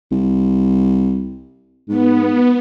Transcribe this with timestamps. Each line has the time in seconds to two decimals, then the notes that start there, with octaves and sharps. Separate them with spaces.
0.11 C2
1.89 G#2 B3